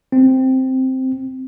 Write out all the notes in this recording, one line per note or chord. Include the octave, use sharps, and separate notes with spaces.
C4